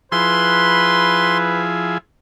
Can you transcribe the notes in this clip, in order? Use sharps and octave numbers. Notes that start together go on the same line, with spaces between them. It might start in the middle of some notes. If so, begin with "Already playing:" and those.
F3 E4 G#4 B4 C6